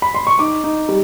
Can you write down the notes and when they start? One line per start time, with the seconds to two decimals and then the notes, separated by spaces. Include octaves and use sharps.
0.02 B5
0.14 C6
0.27 C#6
0.39 D#4 D6
0.64 D#4
0.89 G3